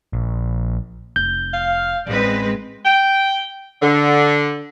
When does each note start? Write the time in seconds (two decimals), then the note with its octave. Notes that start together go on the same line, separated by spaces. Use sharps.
0.13 A#1
1.16 F1 G6
1.54 F5
2.07 A1 G#3 B3 C4 D#4 B4 D5
2.85 G5
3.81 D3